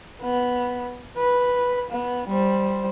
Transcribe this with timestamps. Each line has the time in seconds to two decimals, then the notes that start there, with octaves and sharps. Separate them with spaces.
0.21 B3
1.17 B4
1.90 B3
2.27 G3 C5